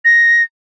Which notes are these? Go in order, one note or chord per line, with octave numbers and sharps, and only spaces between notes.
A#6